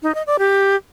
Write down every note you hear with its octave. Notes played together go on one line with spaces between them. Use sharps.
D#4
D#5
D5
G4